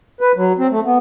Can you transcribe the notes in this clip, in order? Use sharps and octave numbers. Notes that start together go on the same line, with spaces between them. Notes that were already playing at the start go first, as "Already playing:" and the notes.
B4
F#3
C4
A3
B3